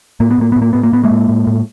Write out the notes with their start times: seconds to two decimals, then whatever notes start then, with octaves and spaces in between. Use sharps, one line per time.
0.20 A2 A#3
0.31 B3
0.38 A2 A#3
0.52 A2 B3
0.62 A#3
0.73 A2 B3
0.83 A#3
0.92 A2 B3
1.03 G#3 A#3
1.11 A2
1.29 A2
1.47 A2